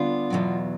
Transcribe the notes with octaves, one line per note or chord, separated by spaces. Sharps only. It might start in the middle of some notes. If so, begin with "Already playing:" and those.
Already playing: D3 G3 B3 D4 F4
E2 B2 F#3